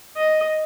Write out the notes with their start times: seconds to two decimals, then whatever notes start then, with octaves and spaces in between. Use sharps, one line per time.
0.17 D#5